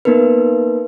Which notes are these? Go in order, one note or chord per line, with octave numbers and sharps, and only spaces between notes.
A#3 B3 D#4 A#4 B4